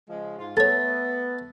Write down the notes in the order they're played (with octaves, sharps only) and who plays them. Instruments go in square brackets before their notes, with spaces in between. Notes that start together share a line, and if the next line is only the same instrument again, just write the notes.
[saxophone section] C#3 F3 G#3
G#2 F4
[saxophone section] A3 B3 [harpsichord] A4 C#5 [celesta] A6